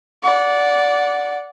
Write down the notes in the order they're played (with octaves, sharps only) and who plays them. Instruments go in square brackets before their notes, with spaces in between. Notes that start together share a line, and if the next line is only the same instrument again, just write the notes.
[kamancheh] D5 F#5